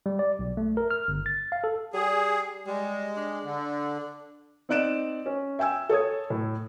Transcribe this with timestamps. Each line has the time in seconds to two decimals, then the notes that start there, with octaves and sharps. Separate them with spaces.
0.06 G3
0.19 D5
0.39 B1
0.57 A3
0.77 A#4
0.91 F6
1.08 G1
1.26 A6
1.52 F5
1.64 A4
1.94 G3 G#4
2.67 G3 G#3
3.17 D4
3.44 D3
4.69 C4 D#4 D5 F#6 D7 E7
5.26 C#4
5.59 E5 G5 G#5 E6
5.89 A4 C#5 D#6 G#6
6.30 A2